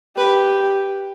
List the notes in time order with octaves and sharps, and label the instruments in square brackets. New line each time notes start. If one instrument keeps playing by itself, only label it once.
[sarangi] G4 [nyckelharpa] B4